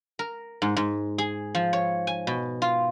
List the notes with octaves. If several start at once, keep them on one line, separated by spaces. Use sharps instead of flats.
A#4
G#2
G#2
G#4
F3
C#5
G#5
B2
F4